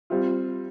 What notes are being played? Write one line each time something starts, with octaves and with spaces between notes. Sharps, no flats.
G3 C4 F4